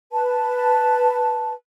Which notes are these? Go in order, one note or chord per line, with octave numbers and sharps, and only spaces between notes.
B4 A5